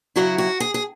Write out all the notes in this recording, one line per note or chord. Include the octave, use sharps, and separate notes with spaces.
C#3 F#3 E4 F#4
F#4
G#4
G#4